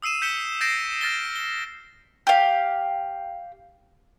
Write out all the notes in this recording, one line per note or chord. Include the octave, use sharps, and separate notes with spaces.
D#6 E6 C7 D#7 E7
G6 B6 C#7 E7 G7
G6 A6 A#6 C7 D7 E7
F6 A6 A#6 G7
G7
G4 F5